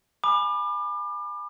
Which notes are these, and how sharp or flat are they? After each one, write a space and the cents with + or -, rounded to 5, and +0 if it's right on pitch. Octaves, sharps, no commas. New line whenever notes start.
G#5 +0 B5 -5 D6 +35